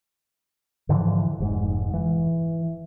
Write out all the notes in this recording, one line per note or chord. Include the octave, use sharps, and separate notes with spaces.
G#2 D3 E3 F3
F1 G#2
E3